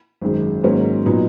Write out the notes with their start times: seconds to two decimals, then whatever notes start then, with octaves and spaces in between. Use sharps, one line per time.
0.21 G#1 F#2 D#3 G#3
0.63 G#2 D#3 F#3 A#3 C#4
1.05 A#2 F#3 B3 D#4